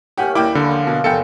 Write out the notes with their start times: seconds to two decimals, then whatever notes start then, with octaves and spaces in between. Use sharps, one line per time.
0.17 A2 A#3 C#4 G4 F#5 G#5
0.35 D#2 G3 E4 G5 D6
0.55 D3 F3 A#3 E4
0.71 F3
0.87 B2 A#4
1.04 F1 E2 A4 G5 C#7